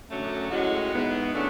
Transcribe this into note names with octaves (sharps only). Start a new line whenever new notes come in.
F#2 D3 F#3 A3 C#4
A2 G#3 C#4 F#4
G#2 E3 B3
C#3 F#3 A3 D4